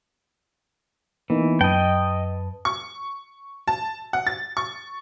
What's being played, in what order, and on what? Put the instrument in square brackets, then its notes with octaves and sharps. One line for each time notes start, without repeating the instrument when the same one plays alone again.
[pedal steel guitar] E3 [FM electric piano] A#3 B3 D#4
[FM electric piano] F#2 B4 A5 [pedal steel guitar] D#5 G5
[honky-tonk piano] C#6
A5
F#5
A6
C#6